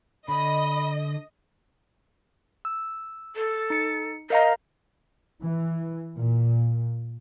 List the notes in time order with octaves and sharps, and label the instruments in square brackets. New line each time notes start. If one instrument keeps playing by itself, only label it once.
[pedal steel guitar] D3 [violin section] D#5 [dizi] B5
[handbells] E6
[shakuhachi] A4
[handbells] D#4 C#7
[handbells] A#4 F5 A#5 [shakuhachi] D#5
[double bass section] E3
A#2